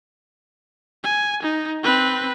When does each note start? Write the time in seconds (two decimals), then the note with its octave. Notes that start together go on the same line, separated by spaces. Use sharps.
1.04 G#5
1.43 D#4
1.83 C4 B4